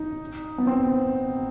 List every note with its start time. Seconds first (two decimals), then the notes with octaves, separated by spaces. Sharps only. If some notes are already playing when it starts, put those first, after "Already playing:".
Already playing: D#4
0.58 B3
0.67 C4